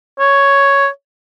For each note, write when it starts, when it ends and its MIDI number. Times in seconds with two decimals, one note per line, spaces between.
0.19 0.88 73